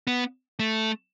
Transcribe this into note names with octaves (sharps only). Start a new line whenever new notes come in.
B3
A3